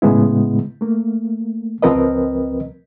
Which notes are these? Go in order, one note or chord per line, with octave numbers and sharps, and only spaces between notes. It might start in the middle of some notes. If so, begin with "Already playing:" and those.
A2 C#3 G#3 B3 E4
A3 A#3
C#2 F3 C4 A#4 B4 D#5